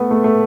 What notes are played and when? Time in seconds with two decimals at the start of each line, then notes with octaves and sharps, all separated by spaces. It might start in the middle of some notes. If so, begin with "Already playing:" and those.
Already playing: A3 B3
0.11 A3
0.24 A3